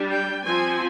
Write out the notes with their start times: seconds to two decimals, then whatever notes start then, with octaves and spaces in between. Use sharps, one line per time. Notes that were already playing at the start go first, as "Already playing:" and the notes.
Already playing: G3 D4
0.10 G5
0.44 F3 C4 G#5